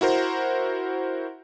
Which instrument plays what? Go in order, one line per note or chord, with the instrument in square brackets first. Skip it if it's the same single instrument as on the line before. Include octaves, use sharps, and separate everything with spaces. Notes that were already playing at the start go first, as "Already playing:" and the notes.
[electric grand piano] E4 F#4 A#4 C5